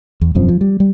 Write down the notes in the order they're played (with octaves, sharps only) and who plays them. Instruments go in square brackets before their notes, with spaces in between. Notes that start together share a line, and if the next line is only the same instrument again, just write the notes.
[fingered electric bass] E2
E1 F#2 F3 C4
F3
G3
G3